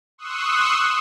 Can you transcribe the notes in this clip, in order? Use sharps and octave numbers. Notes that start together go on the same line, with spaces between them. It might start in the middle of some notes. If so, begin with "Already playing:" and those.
C6 C#6 D#6 E6 F#6